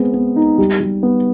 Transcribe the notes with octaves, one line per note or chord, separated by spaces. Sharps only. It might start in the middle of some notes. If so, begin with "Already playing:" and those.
Already playing: G#3 B3 C4
B3
D#4
G3
G3
B3